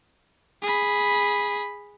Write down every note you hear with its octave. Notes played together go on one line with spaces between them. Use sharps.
G#4 B5